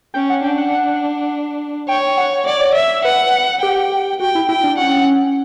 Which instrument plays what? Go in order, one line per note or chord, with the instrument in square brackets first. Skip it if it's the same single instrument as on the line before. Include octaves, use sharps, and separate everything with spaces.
[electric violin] C#4 [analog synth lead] G5
[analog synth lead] F#5
[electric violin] D4 [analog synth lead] G5
[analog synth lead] F#5
[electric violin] C#5 [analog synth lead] G5
[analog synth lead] F#5
[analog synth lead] C#5 [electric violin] D5
[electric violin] E5
[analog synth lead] B4 [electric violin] F#5
[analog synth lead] G4 [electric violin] G5
[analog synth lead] F#4 [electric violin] G5
[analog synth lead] E4
[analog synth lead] E4 [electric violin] G5
[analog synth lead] D4
[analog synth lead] C#4 [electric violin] F#5